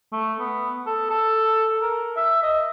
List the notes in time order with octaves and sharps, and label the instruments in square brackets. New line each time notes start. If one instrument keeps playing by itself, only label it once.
[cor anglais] A3
B3
A4
A4
A#4
E5
D#5